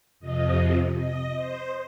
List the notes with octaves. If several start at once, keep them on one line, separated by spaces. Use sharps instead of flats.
F2 C3 F3 D#5
D#5
C5